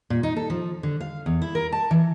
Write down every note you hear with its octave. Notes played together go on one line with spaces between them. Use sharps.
A#2
D#4
A4
F3
D3
F5
E2
E4
A#4
A5
E3